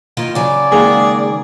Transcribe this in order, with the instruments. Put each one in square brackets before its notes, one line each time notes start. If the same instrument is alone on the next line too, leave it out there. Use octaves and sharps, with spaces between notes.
[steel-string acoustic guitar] D#3 A#3 F4
[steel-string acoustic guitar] C#3 F#3 [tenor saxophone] D5
[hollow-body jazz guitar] D#3 G#3 A#3 [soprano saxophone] G#4